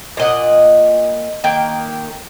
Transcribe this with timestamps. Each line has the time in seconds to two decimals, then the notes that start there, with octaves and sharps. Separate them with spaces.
0.17 A#2 D#5 F#5
1.44 D#3 A#3 G5